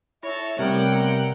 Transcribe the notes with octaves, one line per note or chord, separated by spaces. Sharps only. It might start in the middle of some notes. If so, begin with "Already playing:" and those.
E4 A4 C#5 E5
C3 G3 A3 A#4 C#5 F#5 G5
B3 A#5